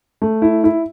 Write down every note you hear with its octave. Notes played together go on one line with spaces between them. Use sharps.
A3
E4
E4